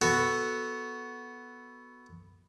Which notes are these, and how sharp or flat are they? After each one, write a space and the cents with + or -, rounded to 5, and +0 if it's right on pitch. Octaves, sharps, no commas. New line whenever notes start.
B3 +0 F#4 +0 A4 +0